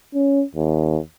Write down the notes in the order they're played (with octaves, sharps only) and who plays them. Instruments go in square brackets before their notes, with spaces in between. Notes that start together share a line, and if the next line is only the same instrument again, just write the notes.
[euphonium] C#4
D#2